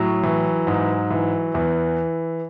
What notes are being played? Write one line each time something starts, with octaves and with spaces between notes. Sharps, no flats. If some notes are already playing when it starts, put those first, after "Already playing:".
Already playing: A2 F#3
E3
G#2
E3
E2 E3